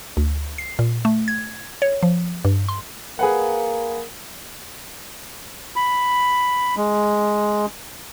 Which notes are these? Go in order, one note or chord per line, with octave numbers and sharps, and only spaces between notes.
D2
C7
A#2
A3
G#6
C#5
F3
G2
C6
A#3 G#4 B4 F#5
B5
G#3